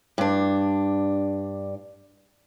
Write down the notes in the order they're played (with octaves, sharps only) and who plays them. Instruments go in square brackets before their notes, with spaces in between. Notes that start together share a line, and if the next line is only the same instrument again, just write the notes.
[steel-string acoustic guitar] G2 D4